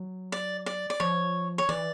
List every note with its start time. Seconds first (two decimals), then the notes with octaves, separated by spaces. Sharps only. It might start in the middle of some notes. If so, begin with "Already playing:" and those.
Already playing: F#3
0.32 D5
0.66 D5
0.90 D5
1.00 F3 C#5
1.58 C#5
1.69 E3 D5